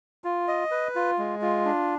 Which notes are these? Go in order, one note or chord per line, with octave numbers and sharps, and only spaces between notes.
F4
D#5
B4
F4
G#3
F4
D4